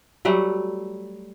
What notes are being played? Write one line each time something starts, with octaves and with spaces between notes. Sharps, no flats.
F#3 G3 A3 F#5